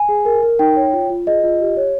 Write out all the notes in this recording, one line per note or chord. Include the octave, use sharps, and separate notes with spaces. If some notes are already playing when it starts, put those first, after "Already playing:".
Already playing: G#5
G#4
A#4
A#4
D#4 G5
C#5
F4
F4
G#4 D#5
F4
G4
C#5